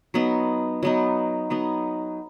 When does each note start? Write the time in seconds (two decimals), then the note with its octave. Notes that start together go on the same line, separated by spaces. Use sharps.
0.14 F#3 B3 D#4
0.83 F#3 B3 D#4
1.50 F#3 B3 D#4